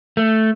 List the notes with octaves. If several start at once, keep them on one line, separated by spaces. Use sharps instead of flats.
A3